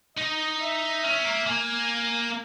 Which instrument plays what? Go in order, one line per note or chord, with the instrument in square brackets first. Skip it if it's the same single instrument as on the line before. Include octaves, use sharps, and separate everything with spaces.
[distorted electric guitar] D#4 [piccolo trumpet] D#5
[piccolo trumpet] E5
[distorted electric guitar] C#4 [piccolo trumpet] E5
[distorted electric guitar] A#3
[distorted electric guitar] A#3 [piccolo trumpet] G#5